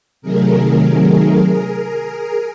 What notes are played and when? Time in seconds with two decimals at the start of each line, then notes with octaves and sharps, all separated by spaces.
0.22 C3 D#3 F#3 A3 G#4 A#4